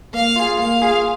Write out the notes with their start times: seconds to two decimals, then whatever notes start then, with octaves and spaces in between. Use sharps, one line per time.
0.14 A#3 F5
0.36 F4 G#4
0.59 A#3 F5
0.82 F4 G#4